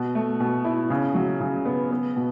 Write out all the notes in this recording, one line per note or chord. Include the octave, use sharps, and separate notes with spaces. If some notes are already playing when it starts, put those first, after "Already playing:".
Already playing: B2
A3
B2
E4
C#3
F#3
C#3
B3
B3
B2